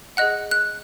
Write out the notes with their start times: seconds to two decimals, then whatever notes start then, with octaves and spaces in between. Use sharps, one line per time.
0.17 G#4 D#5 F#5 F#6
0.51 F#6